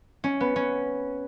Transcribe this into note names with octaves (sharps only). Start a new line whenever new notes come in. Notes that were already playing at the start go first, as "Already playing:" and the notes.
C#4
B3
C#4